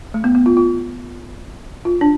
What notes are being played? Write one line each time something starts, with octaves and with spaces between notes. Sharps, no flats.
A3
B3
B3
F4
F4
F4
D4